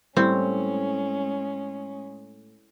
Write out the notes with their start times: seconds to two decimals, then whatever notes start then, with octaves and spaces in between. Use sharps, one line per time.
0.17 A2 G3 G#3 C4 C#4